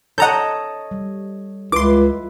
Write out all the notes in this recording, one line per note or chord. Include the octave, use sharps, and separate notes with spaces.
A4 C#5 D#5 F#5 A#5 G6
G3
C#2 E4 F4 B4 C6 D6